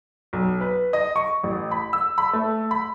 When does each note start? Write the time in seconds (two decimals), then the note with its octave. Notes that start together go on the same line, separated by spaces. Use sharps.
0.33 B1
0.61 B4
0.93 D#5
1.16 C#6
1.43 A1
1.71 B5
1.93 E6
2.18 B5
2.33 A3
2.71 B5